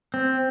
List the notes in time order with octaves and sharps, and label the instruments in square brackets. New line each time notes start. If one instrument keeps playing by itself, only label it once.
[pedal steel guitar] C4